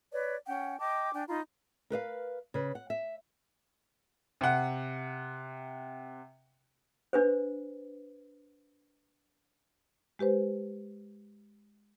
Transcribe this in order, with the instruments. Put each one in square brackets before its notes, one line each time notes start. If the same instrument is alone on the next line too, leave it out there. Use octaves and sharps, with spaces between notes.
[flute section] B4 C#5 D5
C#4 F#5 G5
D#5 G5 A5 D6
D4 G5 G#5
D#4 F4 A#5 B5
[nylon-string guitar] A#4 B4 D#5 F5
C#3 B4
F#5
E5
[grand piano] C3 F#5
[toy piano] D4 B4 C5
[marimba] G#3 G4 B4 C5